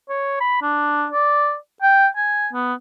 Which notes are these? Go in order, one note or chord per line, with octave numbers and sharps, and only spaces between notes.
C#5
B5
D4
D5
G5
G#5
B3